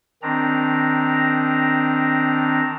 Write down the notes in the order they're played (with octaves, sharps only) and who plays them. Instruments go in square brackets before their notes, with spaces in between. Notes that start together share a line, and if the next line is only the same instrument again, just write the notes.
[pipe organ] D#3 C4 D4 A#5